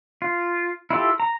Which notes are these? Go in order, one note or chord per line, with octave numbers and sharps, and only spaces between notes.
F4
E4 F4 G4 A4
A#5